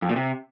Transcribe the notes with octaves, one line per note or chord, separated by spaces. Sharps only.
F2
A#2
C3